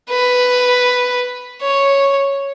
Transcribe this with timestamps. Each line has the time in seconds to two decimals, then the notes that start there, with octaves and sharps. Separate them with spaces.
0.10 B4
1.62 C#5